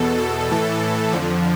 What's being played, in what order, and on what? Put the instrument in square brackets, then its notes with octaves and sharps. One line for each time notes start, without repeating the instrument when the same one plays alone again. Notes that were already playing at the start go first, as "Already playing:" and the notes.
Already playing: [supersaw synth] E2 B2 A4
A4
A2 E3 A4
F2 D3 F3